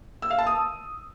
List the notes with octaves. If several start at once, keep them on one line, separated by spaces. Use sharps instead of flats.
E6
F5
A5
D#6